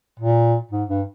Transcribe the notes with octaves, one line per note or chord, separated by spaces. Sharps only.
A#2
G#2
G2